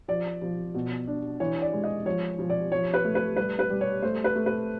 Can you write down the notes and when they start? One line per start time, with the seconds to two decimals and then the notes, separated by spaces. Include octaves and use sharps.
0.08 F3 D5
0.42 F3
0.74 B2
1.07 D4
1.40 E3 C#5
1.62 D5
1.73 G#3
1.84 D#5
2.05 F3 C#5
2.39 F3
2.50 D5
2.72 F3 C#5
2.94 B4
3.04 A3
3.15 B4
3.36 G3 B4
3.59 B4
3.70 G3
3.81 C#5
4.02 A3 C5
4.24 B4
4.35 A3
4.46 B4